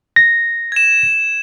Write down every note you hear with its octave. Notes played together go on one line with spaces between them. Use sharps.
A#6
G#6 E7